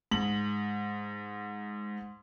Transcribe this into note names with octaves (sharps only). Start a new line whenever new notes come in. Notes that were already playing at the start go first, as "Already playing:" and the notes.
G#2 F#7